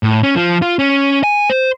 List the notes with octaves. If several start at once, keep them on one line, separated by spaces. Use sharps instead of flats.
A2
C#4
F3
F4
C#4
G#5
C5